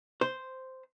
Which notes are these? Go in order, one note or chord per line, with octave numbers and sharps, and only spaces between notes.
C5